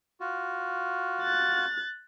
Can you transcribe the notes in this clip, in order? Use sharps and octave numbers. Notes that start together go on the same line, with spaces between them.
F4 F#4
F#6 A6